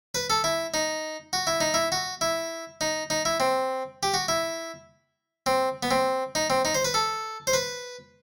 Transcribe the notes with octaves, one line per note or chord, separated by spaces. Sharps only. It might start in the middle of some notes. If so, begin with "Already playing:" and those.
B4
A4
E4
D#4
F#4
E4
D#4
E4
F#4
E4
D#4
D#4
E4
C4
G4
F#4
E4
C4
B3
C4
D#4
C4
D#4
C5
B4
A4
C5
B4